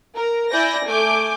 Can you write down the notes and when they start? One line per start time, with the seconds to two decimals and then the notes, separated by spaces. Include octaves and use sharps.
0.17 A#4
0.51 E4 D5 G#5 G6 A#6
0.86 A3 G#5 D6 G6